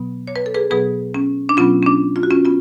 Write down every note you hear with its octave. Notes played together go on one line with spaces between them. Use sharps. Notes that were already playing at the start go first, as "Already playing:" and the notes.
Already playing: B2 F#3 B3
C#5
B4
A4
G#4 B4
B2 F#3 B3 G#4 B4
C#4
D4
B2 F#3 B3 C#4 F4
C#4
D4
F4
F#4
C#4 F4
B3 C#4 F4